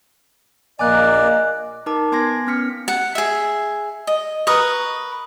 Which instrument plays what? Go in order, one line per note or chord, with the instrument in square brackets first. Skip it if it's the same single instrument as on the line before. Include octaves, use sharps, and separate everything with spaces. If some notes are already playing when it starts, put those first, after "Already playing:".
[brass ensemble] A#1 A#3 [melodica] D5 [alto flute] D#5 [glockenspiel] G#5 F#6
[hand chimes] D#4 A#4 A5 D6
B3 G#5 C6 G#6 A#6
B3 C#4 F6 B6 C#7
[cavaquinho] F#5
G#4 E5
D#5
A#4 B4 C#6 D#6